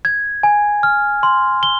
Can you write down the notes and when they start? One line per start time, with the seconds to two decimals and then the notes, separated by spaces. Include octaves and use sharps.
0.05 G#6
0.43 G#5
0.83 F6
1.23 C6
1.63 G7